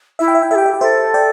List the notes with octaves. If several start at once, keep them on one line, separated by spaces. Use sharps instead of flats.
E4 E5
G5
E5
G5
A4 E5
G4 G5
E5
G5
A4 C5 E5
D5 G5